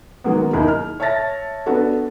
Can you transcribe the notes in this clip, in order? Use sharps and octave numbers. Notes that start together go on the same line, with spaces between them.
D#3 F#3 G#3 A#3 B3
D#2 D#3 A#3 D#4 E4 G#4
F6
C#5 E5 A5 A6 A#6
B3 D4 F#4 A4